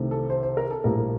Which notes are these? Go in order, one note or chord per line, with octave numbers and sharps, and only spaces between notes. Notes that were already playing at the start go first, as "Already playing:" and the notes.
Already playing: C2 C3 D#3 A3
A4
C5
C5
A#4
A4
A#1 A2 G3 A#3 A#4